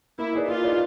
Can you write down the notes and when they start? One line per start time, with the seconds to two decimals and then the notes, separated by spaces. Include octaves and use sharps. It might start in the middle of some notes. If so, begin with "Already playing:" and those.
0.19 A#3 E4
0.33 D#4 G#4 B4 D5
0.48 A#3 F4
0.64 D#4 G#4 B4 D5